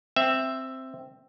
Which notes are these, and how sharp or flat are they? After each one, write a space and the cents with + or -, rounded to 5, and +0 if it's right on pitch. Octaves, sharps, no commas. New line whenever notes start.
C4 +0 E5 +5